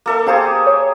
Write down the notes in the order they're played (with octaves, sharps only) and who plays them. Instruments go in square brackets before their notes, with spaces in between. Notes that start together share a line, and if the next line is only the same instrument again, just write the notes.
[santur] A#3 A4 E5
[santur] G4 G#4 [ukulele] C5 F5 A#5
[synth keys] C#5